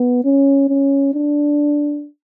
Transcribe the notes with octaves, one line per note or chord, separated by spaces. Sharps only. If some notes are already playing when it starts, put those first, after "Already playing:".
Already playing: B3
C#4
C#4
D4